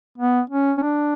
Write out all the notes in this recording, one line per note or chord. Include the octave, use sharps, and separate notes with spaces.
B3
C#4
C#4
D4